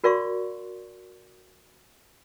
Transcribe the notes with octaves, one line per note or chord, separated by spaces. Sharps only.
F#4 A#4 D5 F5 C6 C#6